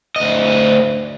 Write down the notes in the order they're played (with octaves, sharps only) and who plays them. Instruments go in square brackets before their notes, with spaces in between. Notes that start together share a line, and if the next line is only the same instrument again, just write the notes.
[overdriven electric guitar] D2 D#5